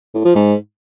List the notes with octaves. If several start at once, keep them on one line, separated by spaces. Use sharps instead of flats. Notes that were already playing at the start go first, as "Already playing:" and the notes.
A2
F3
G#2